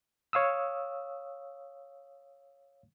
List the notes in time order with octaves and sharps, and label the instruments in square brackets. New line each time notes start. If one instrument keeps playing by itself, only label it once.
[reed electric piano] C#5 F5 D#6 E6